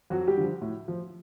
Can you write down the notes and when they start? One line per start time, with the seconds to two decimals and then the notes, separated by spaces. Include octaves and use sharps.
0.10 F2 F#3 F#4
0.27 G3 G4
0.37 D3 F3
0.62 A2
0.88 F3